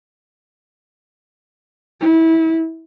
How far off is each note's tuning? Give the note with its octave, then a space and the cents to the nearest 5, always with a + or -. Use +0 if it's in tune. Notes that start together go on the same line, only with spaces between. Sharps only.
E4 -25